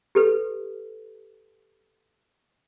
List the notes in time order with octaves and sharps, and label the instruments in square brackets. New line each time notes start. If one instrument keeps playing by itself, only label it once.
[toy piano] G4 A4 B4